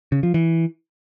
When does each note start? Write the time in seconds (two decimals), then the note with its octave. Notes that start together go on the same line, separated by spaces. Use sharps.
0.12 C#3
0.23 F3
0.34 E3